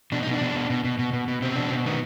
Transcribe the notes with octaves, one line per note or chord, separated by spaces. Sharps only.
B2 D4
B2 D#4
D4
B2
B2
B2
B2
B2
B2
B2
B2 C4
B2 D4
B2 C4
D#3 B3